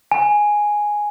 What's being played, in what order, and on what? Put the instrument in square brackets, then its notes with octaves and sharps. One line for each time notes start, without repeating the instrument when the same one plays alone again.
[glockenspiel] G#5